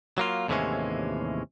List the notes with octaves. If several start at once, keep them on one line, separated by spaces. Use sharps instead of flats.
F#3 A#3 F4
D#2 A2 C3 E3 G#3 C#4